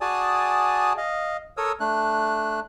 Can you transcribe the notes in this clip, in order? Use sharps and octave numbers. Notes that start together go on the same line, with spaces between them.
F#4 G#4 D5 G#5 A5 D#6
D#5 F5
A4 A#4 C#5 D#6 E6
A3 D4 F#6